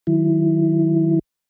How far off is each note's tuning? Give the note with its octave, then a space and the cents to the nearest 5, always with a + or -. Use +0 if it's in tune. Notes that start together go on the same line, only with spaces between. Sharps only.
D#3 +0 F#3 +0 E4 +0